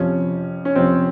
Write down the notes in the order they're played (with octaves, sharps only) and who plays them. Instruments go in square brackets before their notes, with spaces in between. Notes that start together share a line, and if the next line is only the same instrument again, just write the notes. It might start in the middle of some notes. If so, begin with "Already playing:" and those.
Already playing: [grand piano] F2 C3 F3 [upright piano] C#4
[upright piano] C#4
[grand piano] F2 C3 F3 [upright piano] C4